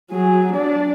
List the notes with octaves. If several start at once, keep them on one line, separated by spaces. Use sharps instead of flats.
F#3 G#4
D4 D5